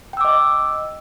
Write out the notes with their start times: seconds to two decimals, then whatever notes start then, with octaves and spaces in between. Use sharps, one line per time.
0.13 G5
0.17 E6
0.21 D6
0.25 D#5